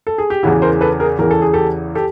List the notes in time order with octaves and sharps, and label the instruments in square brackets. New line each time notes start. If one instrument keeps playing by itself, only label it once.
[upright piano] A4
G#4
G4
E2 C#3 E3 E4 F#4
A#4 C5
A4 B4
G#4 A#4
E2 C#3 E3 A#4
A4
G#4
G4 A4
G4 A4